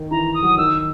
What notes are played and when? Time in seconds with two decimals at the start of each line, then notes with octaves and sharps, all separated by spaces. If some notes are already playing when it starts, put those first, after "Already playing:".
Already playing: D#3
0.11 E3 A#5
0.34 D#6
0.43 F#3
0.58 D#3 E6